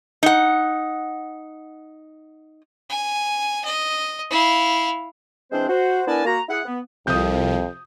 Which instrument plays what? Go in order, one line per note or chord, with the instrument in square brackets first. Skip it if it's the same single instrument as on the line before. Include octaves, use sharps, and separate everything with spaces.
[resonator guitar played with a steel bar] D#4 F#5
[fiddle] G#5
D#5
E4 F5
[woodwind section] E3 G#3 C4 D4 C5
F#4 C5
B3 D4 E4 A#4 G#5 A5
A#3 F#4 A#5
E4 G#4 F#5
B3
[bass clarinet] C2 [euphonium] F2 [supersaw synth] C3 F3 [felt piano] D#6 G6